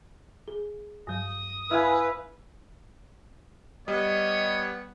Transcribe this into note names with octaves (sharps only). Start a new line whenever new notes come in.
G#4
G2 F#3 D#6
E4 B4 F5 G#5
G3 B3 C#5 D#5